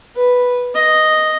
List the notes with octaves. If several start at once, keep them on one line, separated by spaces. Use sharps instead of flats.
B4
D#5